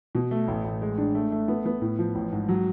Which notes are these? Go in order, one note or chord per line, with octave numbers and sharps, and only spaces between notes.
B2
A3
A1
A1
G#3
D4
A3
A3
B3
B3
A2
F3
A1
G#2
F#3